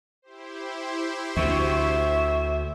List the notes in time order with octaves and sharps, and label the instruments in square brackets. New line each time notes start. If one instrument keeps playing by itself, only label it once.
[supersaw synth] E4 G4 C5
[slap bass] D2 D3 [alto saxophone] E5 [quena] C#6